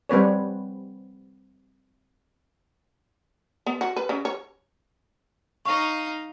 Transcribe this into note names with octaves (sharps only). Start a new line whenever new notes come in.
G3 C4 B4 C#5
B3
F#4
B4
C#3
C#5
D#4 F5 C#6